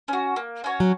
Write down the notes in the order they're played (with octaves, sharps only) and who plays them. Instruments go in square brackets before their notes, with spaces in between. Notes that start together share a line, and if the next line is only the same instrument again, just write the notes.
[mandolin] C#4 F#4
A#3
C#4 F#4 C#5
[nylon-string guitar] F#3